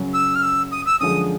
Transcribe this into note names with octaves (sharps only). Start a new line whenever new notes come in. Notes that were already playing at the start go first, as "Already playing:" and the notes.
Already playing: F#2 C#3 F#3
E6
F6
E6
D#6
E6
F#2 D3 F3 G#3 D#6